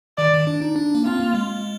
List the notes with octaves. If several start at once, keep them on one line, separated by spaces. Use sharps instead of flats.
D#3 D5
D#3
D4
D#4
D4
A#3
C4 F4
A#3
G#3